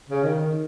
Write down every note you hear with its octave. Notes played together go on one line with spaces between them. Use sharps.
C#3
D#3